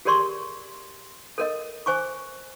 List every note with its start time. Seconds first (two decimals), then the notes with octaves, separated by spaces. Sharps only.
0.05 G4 G#4 A#4 D5 C6 C#6
1.38 A4 A#4 D#5
1.86 C5 G#5 C#6 D6